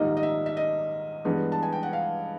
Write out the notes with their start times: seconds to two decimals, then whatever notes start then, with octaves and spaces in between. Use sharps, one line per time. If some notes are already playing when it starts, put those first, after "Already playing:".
Already playing: A#1 G#2 D#3 G3 A#3 D#5
0.17 D#5
0.23 E5
0.46 E5
0.57 D#5
1.25 G2 E3 G#3 B3
1.52 A5
1.63 G#5
1.72 G5
1.83 F#5
1.93 F5